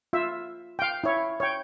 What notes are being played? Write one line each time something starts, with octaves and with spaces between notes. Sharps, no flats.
F4 E5
F5 G5
E4 C#5
C#5 G5